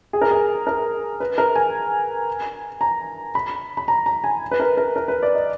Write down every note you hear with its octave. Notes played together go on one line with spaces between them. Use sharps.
G#4
A#4
G#4
A#4
B4
A#4
G#5
A#5
B5
B5
A#5
A#5
G#5
B4
A#4
A#4
A#4
B4
D5
D#5